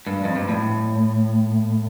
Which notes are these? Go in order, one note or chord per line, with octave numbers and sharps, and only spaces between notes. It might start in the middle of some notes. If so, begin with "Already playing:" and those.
G2
F2
G2
A2